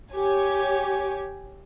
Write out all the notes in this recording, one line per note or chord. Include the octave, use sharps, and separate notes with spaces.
G4 C#5 G#5